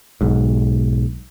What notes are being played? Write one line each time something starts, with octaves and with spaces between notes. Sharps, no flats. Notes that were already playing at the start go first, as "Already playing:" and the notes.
B1 G#2